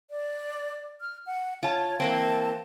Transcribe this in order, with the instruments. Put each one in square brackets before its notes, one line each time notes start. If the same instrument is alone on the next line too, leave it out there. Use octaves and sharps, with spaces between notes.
[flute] D5
F6
F#5
[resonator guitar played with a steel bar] F4 A5 [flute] C#5
[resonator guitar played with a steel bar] E3 A#3 C4 [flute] A5